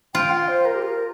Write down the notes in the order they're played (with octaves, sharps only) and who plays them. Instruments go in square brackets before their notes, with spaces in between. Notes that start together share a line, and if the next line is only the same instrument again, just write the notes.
[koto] F4 [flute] G5
[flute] F5
C5
A#4
G4
A#4